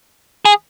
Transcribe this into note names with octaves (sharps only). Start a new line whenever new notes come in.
G#4